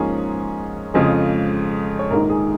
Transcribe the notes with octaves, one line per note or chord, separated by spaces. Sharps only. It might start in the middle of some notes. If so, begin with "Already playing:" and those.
Already playing: G#2 F3 A#3 C#4 G#4 C#5
F2 C#3 F3 G#3
C#5
A#1 G#2 D#3 A#4
G#4